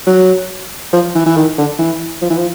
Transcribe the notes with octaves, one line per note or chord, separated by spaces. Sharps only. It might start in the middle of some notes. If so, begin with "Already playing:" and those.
F#3
F3
E3
E3
D#3
D3
E3
F3
E3
F3